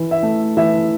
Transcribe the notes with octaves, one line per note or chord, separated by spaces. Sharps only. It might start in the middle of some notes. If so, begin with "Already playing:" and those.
Already playing: E3
E5
A3
E3 E5